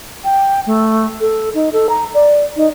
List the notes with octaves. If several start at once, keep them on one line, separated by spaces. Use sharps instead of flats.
G5
A3
A4
D#4
A4
A#5
D5
D#4